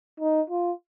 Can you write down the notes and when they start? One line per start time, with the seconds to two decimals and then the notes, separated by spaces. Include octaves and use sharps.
0.20 D#4
0.50 F4